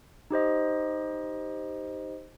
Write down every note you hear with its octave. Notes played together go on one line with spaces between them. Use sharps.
D#4 G4 C5 D#5